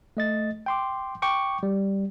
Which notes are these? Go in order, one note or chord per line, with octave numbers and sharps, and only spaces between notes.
A3 D#5 A6
G5 C6 D6
G5 C#6 D6
G3